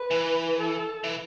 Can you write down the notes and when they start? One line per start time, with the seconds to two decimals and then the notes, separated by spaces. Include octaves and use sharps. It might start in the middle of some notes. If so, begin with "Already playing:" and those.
Already playing: B4
0.11 E3
0.58 A4
1.04 E3